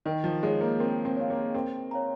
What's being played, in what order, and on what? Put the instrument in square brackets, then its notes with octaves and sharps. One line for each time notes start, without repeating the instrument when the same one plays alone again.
[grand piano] D#3 [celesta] A#4
[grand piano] F3
[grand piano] G#3 [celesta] C#5 F5
[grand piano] A#3
[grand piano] C4 [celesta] A#4
[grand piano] C4
[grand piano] C4 [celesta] C#5 F5
[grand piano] A#3
[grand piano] C4 [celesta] A#4
[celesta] C#5 F5 A#5